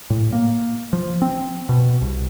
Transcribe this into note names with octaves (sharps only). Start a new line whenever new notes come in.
A2
A#3
F3
C4
B2
C2